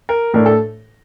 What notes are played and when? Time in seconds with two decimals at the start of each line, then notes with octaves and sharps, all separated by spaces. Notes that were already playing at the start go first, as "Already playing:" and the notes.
0.09 A#4
0.34 A2 A3 D4 A#4
0.46 A4